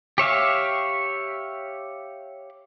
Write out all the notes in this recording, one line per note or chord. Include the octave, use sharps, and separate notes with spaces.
G4 C#5 E5 F5